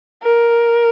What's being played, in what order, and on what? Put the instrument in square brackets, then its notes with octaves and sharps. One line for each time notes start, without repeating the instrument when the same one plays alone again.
[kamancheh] A#4